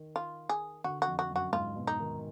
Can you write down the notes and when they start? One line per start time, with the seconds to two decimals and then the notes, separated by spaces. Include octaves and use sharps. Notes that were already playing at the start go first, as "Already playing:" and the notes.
Already playing: D#3
0.16 F4
0.49 G#4
0.84 D3 F#4
1.02 F#4
1.07 F2
1.19 F#4
1.31 F#2
1.36 F#4
1.53 G#2 F4
1.76 B2
1.87 D#4
1.99 D#3